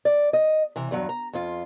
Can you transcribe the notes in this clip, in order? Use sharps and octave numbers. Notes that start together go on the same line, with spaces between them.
D5
D#5
C3 E3
E2 G2 F#3
A#5
F2 F4